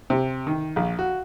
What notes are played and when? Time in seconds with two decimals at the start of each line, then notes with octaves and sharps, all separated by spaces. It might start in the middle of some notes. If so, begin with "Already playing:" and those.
0.10 C3
0.47 D#3
0.76 A#1
0.99 F#4